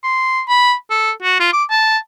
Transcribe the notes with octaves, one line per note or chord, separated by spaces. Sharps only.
C6
B5
A4
F#4
F4
D6
A5